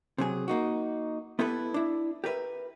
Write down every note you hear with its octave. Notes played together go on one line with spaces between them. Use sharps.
C3 F#3 G#4
A#3 D#4 F#4
B3 E4 G4 A4 B4
D4 E4
G4 A#4 B4 E5